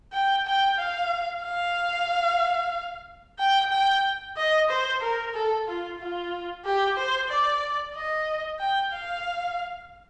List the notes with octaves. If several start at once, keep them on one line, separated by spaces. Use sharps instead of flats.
G5
G5
F5
F5
G5
G5
D#5
C5
A#4
A4
F4
F4
G4
C5
D5
D#5
G5
F5